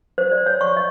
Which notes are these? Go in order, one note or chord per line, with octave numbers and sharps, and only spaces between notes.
C5
D5
C#5
C#6
D#5